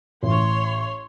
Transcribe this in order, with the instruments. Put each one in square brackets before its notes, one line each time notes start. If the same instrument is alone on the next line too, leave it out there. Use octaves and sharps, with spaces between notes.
[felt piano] A1 [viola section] C#5 C6